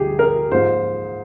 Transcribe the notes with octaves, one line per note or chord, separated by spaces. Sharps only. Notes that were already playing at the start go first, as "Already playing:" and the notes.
Already playing: D2 D3 G3 G4 G#4
A#4
G#2 F3 A#3 C5